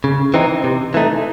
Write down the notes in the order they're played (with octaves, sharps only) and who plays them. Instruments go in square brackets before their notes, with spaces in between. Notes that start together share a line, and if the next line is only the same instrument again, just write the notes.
[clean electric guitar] C#3
E3 C4 D#4
C3
E3 A3 D#4